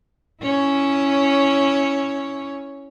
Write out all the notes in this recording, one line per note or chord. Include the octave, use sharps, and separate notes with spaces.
C#4 E4 C#5